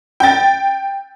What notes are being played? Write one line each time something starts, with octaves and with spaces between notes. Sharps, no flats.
G5 A6